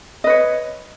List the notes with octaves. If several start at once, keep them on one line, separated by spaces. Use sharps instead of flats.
B4 C#5 D#5